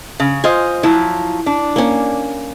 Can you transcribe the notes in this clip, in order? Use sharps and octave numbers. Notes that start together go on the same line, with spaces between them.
C#3
F4 C5 D#5 G#5
F3 F#3 E4
D4
A#3 C#4